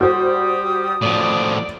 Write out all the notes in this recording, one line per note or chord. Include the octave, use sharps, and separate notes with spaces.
G3 F#4 C5 D#6
A2 F3 D5